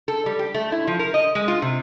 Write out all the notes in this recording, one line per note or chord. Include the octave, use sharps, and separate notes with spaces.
A4
G3
G4
A3
E4
F3
A#4
D#5
G#3
F4
C3